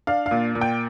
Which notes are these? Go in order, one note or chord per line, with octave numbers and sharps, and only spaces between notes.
D4 F5
F5
A#2
A#2
G5